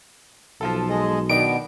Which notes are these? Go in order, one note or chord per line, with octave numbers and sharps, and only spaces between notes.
B1 F3 F4 A4
G#3 G#4 D#5
B2 D#3 B3 D4 D#4 D7